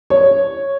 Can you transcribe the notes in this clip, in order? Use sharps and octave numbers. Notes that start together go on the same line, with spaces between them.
C#5